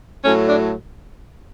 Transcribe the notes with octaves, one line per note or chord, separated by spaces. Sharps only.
A2 F#3 A3 C#4
D4